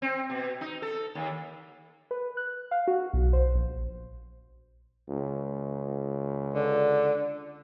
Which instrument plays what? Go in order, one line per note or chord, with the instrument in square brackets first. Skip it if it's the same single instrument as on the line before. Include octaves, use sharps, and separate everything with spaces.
[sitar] C4
B2
D#4
A4
D#2
[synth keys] B4
F#6
F5
F#4
B1
C5
A#1
[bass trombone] C#2
[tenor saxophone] D3